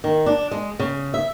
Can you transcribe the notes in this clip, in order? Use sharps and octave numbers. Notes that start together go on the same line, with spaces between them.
D#3
D4
G#3
C#3
E5